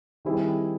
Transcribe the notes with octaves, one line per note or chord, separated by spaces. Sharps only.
D#3 G3 C4 E4 G#4